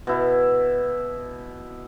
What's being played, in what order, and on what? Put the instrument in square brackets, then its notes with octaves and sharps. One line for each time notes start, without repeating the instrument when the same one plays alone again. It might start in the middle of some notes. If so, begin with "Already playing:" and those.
[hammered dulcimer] B2 E4